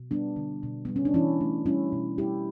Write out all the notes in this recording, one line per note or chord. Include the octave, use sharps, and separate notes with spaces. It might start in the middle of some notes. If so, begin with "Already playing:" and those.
Already playing: B2
G3 B3 D4
D3
B2
G3 B3
C#4
D4
E3 C#4 E4
A3
G3 C#4 E4
B2
G3 E4 G4